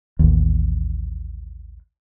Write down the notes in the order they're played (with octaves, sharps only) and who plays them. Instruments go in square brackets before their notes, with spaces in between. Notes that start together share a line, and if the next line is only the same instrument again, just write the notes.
[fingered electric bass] A1 D#2